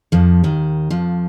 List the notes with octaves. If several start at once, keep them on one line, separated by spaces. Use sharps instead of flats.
F2 F3
D#2 D#3
F2 F3